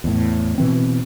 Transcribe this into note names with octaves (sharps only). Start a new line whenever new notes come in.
E2 A2
B2 E3 C4